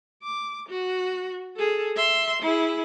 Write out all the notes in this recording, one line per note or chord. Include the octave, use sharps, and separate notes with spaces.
D6
F#4
G#4 A4
E5 C6
E4 G#4